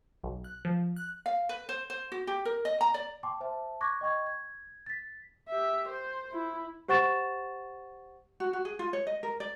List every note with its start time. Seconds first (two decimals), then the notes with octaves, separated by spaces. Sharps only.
0.24 B1
0.44 F#6
0.65 F3
0.96 F#6
1.26 F5
1.49 B4
1.69 C5
1.90 C5
2.12 F#4
2.27 G4
2.45 A#4
2.65 D#5
2.81 A#5
2.94 D5
3.23 G5 A5 C6 D6
3.41 C5 E5 A5
3.81 C#6 D6 F#6 G#6 A#6
4.01 D#5 G5 C#6 G#6
4.26 G#6
4.86 A6 B6
5.49 G4 E5
5.88 C5
6.32 E4
6.88 G4 C5 F#5 C#6 A6 E7
8.40 F#4
8.53 F#4
8.65 G#4
8.79 F4
8.93 C#5
9.07 D#5
9.23 A#4
9.40 D5